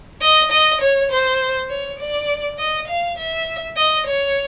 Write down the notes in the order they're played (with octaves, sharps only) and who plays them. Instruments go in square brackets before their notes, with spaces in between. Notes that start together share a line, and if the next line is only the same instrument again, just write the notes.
[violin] D#5
D#5
C#5
C5
C#5
D5
D#5
F5
E5
D#5
C#5